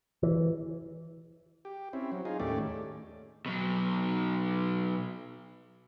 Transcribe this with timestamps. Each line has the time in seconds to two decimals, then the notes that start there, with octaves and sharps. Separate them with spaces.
0.23 E3
1.65 G4
1.93 C4 C#4 E4
2.12 F#3
2.25 D#4 F4 G#4
2.40 D#2 A2 A3 C#4 G4 D5
3.46 B2 F#3